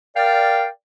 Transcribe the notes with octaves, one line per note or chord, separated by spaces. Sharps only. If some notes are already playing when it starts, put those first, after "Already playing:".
A#4 D5 F5 G5